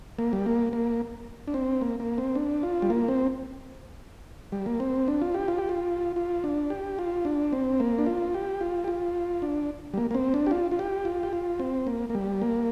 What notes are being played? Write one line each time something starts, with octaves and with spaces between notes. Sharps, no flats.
A#3
G3
A#3
A#3
D4
C4
A#3
A#3
C4
D4
F4
G3
A#3
C4
G3
A#3
C4
D4
F4
G4
F4
G4
F4
F4
D4
G4
F4
D4
C4
A#3
D4
F4
G4
F4
G4
F4
D4
G3
A#3
A#3
C4
D4
G4
F4
F4
G4
F4
G4
F4
C4
A#3
A#3
G3
A#3